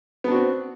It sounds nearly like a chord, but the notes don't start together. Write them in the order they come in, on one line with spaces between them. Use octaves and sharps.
B3 D4 F#4 C4